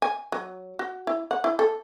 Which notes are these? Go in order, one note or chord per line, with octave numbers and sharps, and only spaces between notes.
G#5
F#3
F#4
E4
F#5
E4
A4